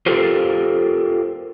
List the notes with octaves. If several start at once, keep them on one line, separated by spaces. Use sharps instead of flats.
F4 G4 A4 A#4 C5